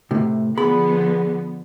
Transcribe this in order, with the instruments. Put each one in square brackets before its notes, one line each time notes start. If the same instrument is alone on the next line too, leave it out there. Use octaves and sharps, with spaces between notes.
[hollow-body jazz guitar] A2 C3
[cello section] D3 F3 B3 [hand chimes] G#4 [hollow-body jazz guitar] B5